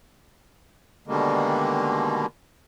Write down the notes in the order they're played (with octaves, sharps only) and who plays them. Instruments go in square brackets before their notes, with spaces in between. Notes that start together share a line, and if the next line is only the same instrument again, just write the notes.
[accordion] B2 D3 D#3 G3 G#3 A#3